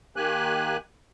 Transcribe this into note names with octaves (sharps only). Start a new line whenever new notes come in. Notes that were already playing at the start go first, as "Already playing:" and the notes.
D#3 A#3 G4 G#5 F#6